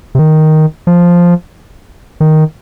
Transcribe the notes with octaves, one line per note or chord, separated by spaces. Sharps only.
C3
D#3
F3
D#3